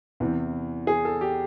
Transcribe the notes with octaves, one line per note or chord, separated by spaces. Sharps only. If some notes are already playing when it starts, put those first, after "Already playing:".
E2 C3 E3
G#4
A4
G4